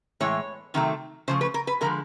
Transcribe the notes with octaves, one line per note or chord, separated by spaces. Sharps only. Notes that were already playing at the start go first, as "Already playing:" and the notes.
A2 E3 G#3 C#5
C3 D#3 F#3 A3
C#3 F3 A3 C5
B4
A#4
B4
D3 F3 G#3 A#4